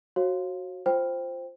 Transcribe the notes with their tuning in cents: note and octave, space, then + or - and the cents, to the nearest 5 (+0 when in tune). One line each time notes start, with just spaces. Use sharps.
F#4 +0 C#5 -40 F5 +0
F4 +0 C5 +0 G5 +0